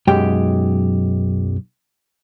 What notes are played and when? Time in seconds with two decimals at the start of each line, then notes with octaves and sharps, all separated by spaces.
0.07 B1 F#2 G#3 G4 G5